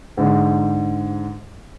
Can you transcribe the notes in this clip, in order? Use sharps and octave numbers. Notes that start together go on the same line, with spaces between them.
G#2 D3